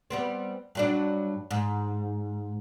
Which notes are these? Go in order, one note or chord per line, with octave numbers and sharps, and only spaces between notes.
G3 B3 C4
G2 F#3 D4
G#2